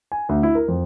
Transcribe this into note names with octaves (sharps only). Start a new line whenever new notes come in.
G#5
D2
E4
A#4
F2